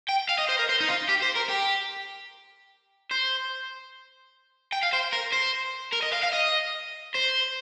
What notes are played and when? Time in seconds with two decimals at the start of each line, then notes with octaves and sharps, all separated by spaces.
0.08 G5
0.29 F5
0.39 D#5
0.49 C5
0.59 A#4
0.69 C5
0.80 D#4
0.89 F4
1.09 G4
1.23 C5
1.36 A#4
1.50 G4
3.11 C5
4.72 G5
4.83 F5
4.93 C5
5.13 A#4
5.33 C5
5.93 A#4
6.03 D#5
6.13 F5
6.23 F5
6.33 D#5
7.14 C5